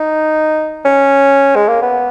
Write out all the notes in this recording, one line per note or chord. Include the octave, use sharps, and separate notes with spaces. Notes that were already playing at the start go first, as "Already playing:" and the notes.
Already playing: D#4
C#4
G#3
A#3
B3